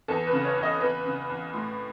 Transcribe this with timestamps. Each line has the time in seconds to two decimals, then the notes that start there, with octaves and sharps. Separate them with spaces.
0.08 E2 A4
0.26 B4
0.33 C#3
0.45 C#5
0.57 E2
0.63 D#5
0.81 E2 B4
1.06 C#3
1.30 E2
1.54 A2